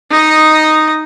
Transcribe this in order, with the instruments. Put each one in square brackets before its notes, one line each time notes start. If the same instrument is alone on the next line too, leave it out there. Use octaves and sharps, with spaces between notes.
[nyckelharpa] D#4 D#5